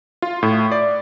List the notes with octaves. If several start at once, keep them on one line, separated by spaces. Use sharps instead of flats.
F4
A2
D5